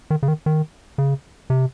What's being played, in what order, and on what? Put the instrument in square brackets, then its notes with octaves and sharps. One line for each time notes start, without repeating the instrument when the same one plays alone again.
[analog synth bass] D#3
C#3
D#3
D#3
C#3
C3